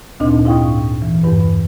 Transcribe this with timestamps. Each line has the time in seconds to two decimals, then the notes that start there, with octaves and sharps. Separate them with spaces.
0.20 D2 A#2 C4 D4 D#4 D#5
0.45 G#2 E4 F5 G5 C#6 D#6
1.02 E3
1.23 E2 G2 B4